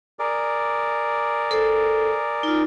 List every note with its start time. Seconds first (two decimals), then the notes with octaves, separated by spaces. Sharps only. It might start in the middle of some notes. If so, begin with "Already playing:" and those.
0.19 G#4 A#4 D5
1.51 A4 C5
2.43 D#4 F4